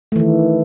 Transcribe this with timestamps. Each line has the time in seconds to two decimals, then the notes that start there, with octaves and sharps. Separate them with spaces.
0.12 A3
0.16 E3
0.19 D#3